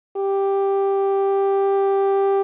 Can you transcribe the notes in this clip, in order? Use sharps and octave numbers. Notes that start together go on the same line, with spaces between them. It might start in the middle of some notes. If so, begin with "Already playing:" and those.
G4